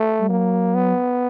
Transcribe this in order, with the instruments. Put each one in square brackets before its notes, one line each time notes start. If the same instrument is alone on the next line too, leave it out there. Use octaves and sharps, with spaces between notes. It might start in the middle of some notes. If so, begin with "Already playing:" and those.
Already playing: [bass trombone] A3
[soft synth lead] G3
[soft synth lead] F#3 [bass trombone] A#3
[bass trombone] B3